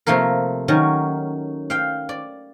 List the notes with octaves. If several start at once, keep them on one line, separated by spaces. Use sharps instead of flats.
C3 F3 A3 A#3 A#4
D#3 F#3 C#4
F5 G5
D5